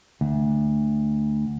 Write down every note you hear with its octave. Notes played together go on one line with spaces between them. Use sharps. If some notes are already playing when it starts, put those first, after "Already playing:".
D2